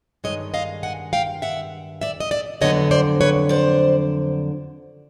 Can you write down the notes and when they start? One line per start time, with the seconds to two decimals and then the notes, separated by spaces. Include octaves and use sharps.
0.24 G2 D#3 G#3 C#5 D#5
0.54 D#5 F5
0.83 F#5 G#5
1.13 F5 G5
1.42 E5 F#5
2.01 D5 E5
2.20 D#5
2.31 D5 E5
2.61 F2 D3 F#3 B3 D4 C#5 D#5
2.91 C5 D5
3.21 B4 C#5
3.49 C5 D5